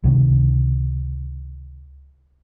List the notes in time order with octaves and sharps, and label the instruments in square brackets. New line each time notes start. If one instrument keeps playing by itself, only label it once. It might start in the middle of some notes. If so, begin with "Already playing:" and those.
[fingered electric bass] C#2 C3 D#3